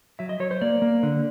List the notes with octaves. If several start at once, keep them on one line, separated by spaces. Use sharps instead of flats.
F#3 E5
D#5
F#3 C#5
C5
A#3 D5
A#3
D3